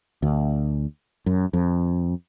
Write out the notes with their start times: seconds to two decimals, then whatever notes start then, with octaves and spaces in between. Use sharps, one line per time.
0.22 D2
1.26 F#2
1.53 F2